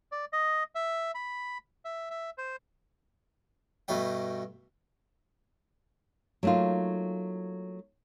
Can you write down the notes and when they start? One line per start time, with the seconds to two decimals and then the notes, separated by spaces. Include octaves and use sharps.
0.12 D5
0.33 D#5
0.75 E5
1.15 B5
1.85 E5
2.10 E5
2.38 C5
3.88 G2 B2 A3 D4 G5
6.43 F#3 A3 A#3 D#4 F4